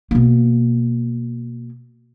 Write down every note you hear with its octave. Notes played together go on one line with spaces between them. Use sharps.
B2 A#3